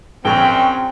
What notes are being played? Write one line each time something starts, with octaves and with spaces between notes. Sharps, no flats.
A#1 F#2 C4 G5 C#6 F7